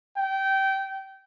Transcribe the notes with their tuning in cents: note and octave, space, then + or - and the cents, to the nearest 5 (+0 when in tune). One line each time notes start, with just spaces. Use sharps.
G5 -20